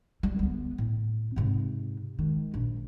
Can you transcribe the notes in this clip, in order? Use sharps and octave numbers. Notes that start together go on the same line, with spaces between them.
G3
D2 B3
A2
G#2 C3
D#3 G#3
A#1